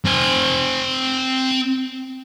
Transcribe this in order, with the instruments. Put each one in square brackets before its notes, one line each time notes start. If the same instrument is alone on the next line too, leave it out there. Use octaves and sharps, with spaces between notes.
[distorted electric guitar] C4 G#5